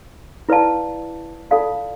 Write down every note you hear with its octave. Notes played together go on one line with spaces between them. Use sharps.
E4 B4 D5 F5 A5
F4 A4 D5 F5 A5